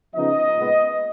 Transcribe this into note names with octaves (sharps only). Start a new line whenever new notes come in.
C#3 F3 B3 D#4 D#5
A#2 G#3 B3